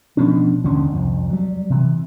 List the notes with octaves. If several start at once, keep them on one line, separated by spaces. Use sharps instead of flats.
B2 F3 C#4 D4
G#1 D#2 D3 C#4
C2 F2
F#3 G3
C3 E3